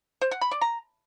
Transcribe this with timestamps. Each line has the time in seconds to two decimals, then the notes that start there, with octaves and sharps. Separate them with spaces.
0.21 C5
0.31 F#5
0.41 B5
0.51 D5
0.61 A#5